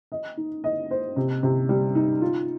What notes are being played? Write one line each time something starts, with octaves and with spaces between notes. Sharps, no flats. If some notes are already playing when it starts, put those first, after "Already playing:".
D#5
D#4
D#5
C5
C3
C3
G3
D#4
F4